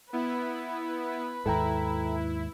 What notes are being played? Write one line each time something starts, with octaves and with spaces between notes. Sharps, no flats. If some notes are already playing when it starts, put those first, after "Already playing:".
B3 E4 B4
D#2 G#2 E4 A4 G5 A#5